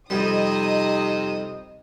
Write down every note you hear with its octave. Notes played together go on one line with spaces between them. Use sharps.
F2 C3 G3 D#4 D#5 D#6